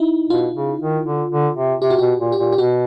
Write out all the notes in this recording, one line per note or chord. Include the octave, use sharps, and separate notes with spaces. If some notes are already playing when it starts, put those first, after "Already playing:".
Already playing: D#4 E4
B2 F4
C#3
D#3
D3
D3
C3
C3 G4
F#4
B2 G4
A#2
G4
A#2
G4
B2 F#4